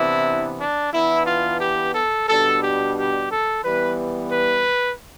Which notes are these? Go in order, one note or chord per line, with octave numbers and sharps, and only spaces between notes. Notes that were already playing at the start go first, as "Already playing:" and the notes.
Already playing: C3 E3 B3 D4 E4
D4
E3 B3 D4 E4
F4
G4
A4
B2 G3 D4 A4
G4
G4
A4
E3 G3 B3 B4
B4